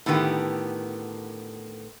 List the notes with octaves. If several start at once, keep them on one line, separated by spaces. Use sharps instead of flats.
A2 D3 D#3 B3 G4